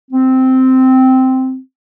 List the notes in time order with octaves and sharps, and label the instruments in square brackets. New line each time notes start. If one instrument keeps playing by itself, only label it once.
[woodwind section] C4